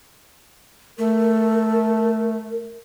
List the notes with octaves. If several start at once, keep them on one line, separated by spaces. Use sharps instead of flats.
A3 A#4